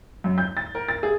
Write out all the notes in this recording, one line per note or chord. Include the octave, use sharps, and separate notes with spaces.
F#2
G6
A6
A#4
A6
G#4